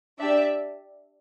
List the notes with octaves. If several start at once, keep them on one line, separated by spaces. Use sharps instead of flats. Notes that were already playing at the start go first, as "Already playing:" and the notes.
D4 G4 D5 E5